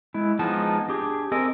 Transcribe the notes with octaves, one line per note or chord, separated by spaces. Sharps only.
G#3 E4
F3 G#3 B3 D#4 A5
D4 G4 G#4
C4 A4 A#4 D#5 G#5